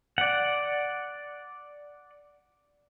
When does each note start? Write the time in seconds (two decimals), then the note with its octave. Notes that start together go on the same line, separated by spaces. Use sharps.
0.18 D5 F#5